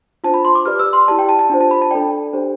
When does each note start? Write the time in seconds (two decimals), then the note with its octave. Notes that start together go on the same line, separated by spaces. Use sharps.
0.24 D4 F4 C5 A5
0.34 B5
0.45 C6
0.55 D6
0.66 G4 B4 D5 F6
0.79 E6
0.93 C6
1.08 E4 G4 D5 A5
1.19 G5
1.29 A5
1.39 A5
1.50 D4 F4 C5
1.61 A5
1.71 B5
1.82 A5
1.91 D4 A4 D5 G5
2.33 D4 G4 C5